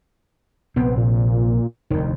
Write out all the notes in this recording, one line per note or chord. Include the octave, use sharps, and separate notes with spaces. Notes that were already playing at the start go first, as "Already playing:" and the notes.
A#1 C3 B3 C4
A#2
F1 D2 D#3